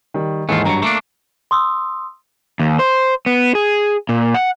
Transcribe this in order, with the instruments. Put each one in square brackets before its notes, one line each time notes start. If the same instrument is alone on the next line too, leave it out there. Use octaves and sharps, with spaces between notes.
[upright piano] D#3 G3
[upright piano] D#2 G#2 E3 [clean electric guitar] A3 F4
[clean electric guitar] G2 F#3 [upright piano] A#5 C#7
[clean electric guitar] A3 A#3 D4 [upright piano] C#7
[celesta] C6 D#6 E6
[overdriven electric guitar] D#2
C5
B3
G#4
A#2
F#5